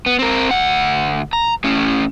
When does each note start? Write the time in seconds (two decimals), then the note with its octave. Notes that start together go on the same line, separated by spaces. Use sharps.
0.06 B3
0.19 C4 A#4
0.51 D2 F#5
1.33 A#5
1.64 A2 C#4